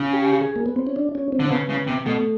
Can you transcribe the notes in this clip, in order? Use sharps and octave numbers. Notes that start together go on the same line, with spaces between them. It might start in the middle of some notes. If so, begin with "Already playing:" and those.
Already playing: C#3
G4
G#4
A#3
B3
C4
C#4
D4
C#4
C4
D3
C#3 B3
C#3
C3
B2 A3